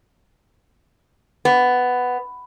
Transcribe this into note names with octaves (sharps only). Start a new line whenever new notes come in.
B3